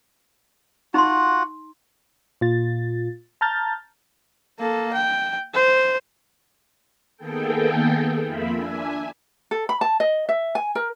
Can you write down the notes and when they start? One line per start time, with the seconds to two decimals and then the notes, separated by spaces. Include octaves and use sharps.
0.94 D#4 F4 F#4 F#5 C6
2.41 A#2 F4 A6
3.41 A5 A#5 F6 G6 A6
4.60 A#3 A4
4.94 G5
5.55 C5
7.17 D#3 A#3 B3 G#4 A4 G5
8.25 F2 A#3 F4 E5 B5
8.53 D4 E5 G#5
9.51 A4
9.69 B5
9.81 A5
10.00 D#5
10.29 E5
10.55 G#5
10.75 A#4